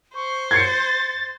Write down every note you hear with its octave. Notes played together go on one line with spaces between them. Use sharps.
C5 C#6
G#6 A6 C7 C#7